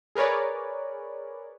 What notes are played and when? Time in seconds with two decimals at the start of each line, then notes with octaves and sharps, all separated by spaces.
0.15 G#4 A#4 B4 C#5 D5